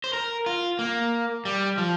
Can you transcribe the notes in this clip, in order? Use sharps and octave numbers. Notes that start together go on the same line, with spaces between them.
C5
A#4
F4
A#3
G3
F3